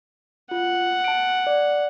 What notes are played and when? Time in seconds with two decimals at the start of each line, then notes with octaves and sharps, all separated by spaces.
0.51 F4 F#5
1.04 A5 D7
1.47 D5